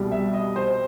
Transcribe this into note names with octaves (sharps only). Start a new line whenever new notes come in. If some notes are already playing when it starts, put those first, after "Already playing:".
Already playing: C2 B2 G3
E5
D#5
C5